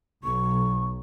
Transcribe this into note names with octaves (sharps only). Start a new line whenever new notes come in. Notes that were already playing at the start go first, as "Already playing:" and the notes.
B1 C#6